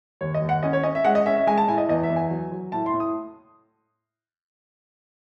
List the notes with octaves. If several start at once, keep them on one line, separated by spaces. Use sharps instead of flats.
D#2 C#5
D#5
D#2
F#5
C#4 D#5
C#5
C#4 D#5
E5
G#3 F#5
D#5
C#4 E5
E5
G#3 G#5
A5
A2 G#5
D#5
E2 D#5
E5
E2
G#5
F#3
F#3
A2 A5
C6
A2
D#6